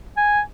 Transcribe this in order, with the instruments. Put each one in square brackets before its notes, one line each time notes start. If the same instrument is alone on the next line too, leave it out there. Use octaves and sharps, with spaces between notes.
[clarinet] G#5